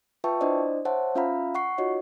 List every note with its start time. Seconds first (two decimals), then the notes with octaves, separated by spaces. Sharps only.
0.24 F4 B4 E5 G5 A5 C#6
0.41 D4 E4 C5 D5 D#5
0.85 C5 C#5 E5 F#5 A5
1.15 C#4 F4 E5 F5 A#5 B5
1.55 F#5 C#6 C7
1.78 D#4 F4 F#4 C#5 D#5